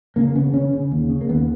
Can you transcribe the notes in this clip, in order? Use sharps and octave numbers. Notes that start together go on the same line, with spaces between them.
C#3 A#3
C#3 B3
C#3 C#4
C#3
D#2
C#3
A#3
D#2 B3